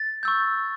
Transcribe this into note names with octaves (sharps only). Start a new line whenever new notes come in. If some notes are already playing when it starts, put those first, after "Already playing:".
Already playing: A6
C#6 E6 G6